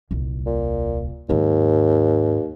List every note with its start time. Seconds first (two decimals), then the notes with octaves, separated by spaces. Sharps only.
0.11 D#1 C2
0.47 A#2
1.29 D#2 G#2 D#3